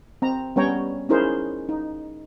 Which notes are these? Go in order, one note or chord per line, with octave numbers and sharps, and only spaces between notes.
C4 A#5
G3 B3 C#4 C#5 G5 A#5
C#4 D#4 E4 G#4 A#4 C5
D#4